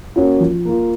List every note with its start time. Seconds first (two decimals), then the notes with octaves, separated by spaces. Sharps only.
0.16 A#3 C#4 F#4
0.40 F3
0.65 A#3 F4